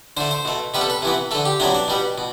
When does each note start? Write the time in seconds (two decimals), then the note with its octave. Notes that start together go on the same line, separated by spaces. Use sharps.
0.17 D3 A3 C5
0.31 C5
0.45 B2 A3
0.74 C3 G3 B3 B4
0.81 A4
0.90 B4
1.02 C3 E3 B3
1.31 D3 A3 A4
1.45 G4
1.60 C3 F#3 B3 D4
1.75 D4
1.88 B2 G3 B3
2.18 B2